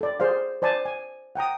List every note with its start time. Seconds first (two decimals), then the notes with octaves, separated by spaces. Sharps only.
0.01 A4 D5
0.20 G#4 C5 D5 F5
0.62 C5 D5 G#5 A5
0.85 G#5
1.35 F#5 G5 A#5 D#6